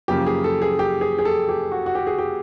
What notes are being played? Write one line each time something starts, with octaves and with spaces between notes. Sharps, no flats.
F#2 C#3 F3 A#3 G4
G#4
A4
G#4
G4
G#4
G#4
A4
G4
F#4
F#4
G4
G#4
G4